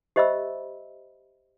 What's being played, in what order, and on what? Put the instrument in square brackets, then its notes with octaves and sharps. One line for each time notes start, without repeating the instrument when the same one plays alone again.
[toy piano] G4 C5 D#5 E5 B5 E6